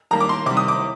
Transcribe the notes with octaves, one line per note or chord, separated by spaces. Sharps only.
D#3 G3 A#3 A#5
D6
C6
C3 D#3 G3 D6
D#6
D6